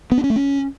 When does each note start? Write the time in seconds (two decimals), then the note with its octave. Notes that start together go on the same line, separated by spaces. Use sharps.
0.12 B3
0.18 D4
0.24 C#4
0.30 A3
0.36 C#4